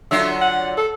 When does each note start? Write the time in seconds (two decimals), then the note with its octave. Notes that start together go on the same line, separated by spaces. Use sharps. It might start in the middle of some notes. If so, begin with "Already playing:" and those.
0.11 D3 F#3 F4 E5
0.41 F#5
0.77 A4